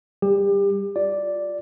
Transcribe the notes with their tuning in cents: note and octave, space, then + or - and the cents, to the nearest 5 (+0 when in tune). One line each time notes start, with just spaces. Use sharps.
G3 +0 G4 +30
F4 +25 D5 +0